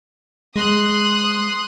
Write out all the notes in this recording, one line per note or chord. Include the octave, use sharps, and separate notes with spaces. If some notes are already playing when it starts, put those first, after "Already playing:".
G#3 C6 D#6 F#6